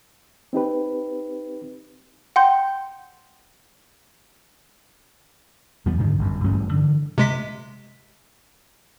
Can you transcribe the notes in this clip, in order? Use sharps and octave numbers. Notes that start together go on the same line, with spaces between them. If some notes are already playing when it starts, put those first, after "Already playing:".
C4 D#4 G4 B4
F#5 G5 C6 G6
E2 G3 B3
G#2 D3 D#3 G#3
G1 F#2
A1 G2 G3 C#4
D3 E3
C3 G#3 B6